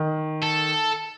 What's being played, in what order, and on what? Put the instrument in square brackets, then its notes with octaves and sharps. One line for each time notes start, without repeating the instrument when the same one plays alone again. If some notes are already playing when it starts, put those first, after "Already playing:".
Already playing: [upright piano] D#3
[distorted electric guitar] A4